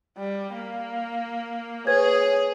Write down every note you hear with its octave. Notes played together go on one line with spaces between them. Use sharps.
G3
A#3
G#4 B4 C#5 G#6